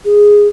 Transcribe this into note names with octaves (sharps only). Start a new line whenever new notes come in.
G#4